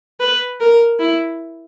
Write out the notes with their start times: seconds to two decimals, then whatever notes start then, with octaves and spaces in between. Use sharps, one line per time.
0.20 B4
0.60 A#4
0.99 E4